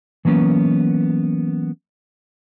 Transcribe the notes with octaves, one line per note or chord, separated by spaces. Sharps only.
E3 F#3 A#3 B3 C#4